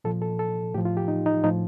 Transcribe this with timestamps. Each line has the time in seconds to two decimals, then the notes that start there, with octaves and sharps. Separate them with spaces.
0.04 A#2 F3 A4
0.22 A4
0.39 A4
0.74 A2 F3 G4
0.85 F4
0.97 G4
1.08 D#4
1.26 D#4
1.43 A2 F3 D#4